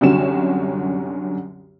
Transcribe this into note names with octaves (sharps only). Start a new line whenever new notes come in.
C2 F#2 D3 F#3 C#4 E7